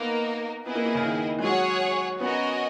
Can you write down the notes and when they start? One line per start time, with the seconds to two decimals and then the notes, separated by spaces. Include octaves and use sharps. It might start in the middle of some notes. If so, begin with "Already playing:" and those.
Already playing: A#3 B3 D#4 A#4
0.66 B3 E4 G#4 D#5
0.75 A#3
0.86 A#3
0.95 C#3
1.04 D#3
1.39 G#3
1.43 F#3 G#4 C#5 F#5
2.20 B3 C#4 F#4 A#4 D#5 G#5